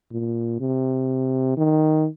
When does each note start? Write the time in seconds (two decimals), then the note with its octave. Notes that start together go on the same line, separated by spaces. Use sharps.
0.12 A#2
0.60 C3
1.57 D#3